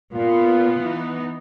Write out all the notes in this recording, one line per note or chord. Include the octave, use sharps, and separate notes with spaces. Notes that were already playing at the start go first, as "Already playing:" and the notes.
A#2 B3 F4
E3 D#4